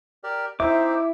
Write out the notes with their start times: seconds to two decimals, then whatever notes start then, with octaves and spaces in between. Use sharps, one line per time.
0.24 G4 A#4 D5
0.60 C4 D#4 E4 C5 E5 D6